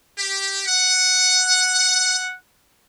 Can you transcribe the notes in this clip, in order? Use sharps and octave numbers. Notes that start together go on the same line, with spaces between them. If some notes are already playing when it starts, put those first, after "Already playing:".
G4
F#5